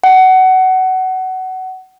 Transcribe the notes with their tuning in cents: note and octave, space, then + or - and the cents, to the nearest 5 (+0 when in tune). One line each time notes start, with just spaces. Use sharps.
F#5 +20